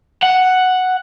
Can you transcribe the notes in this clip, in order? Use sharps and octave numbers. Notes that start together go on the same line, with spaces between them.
F#5